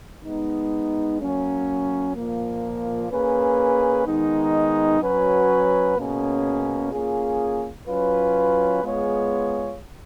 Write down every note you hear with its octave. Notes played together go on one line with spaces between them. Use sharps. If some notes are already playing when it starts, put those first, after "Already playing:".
G#3 B3 D#4
F#3 A#3 C#4
A#2 F3 A#3
A#3 C#4 G#4 B4
D#3 G#3 B3 D#4
F#3 C#4 F#4 B4
B2 A#3 C#4 G#4
A#3 C#4 F4 G#4
F#3 C#4 F4 B4
G#3 B3 F4 G#4 C#5